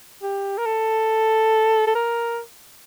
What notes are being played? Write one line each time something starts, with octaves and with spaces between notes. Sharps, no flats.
G4
A#4
A4
A4
A#4